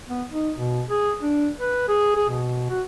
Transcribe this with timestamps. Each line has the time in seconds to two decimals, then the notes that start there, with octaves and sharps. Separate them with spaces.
0.09 B3
0.31 D#4
0.57 B2
0.90 G#4
1.22 D4
1.60 B4
1.88 G#4
2.16 G#4
2.29 B2
2.70 F#4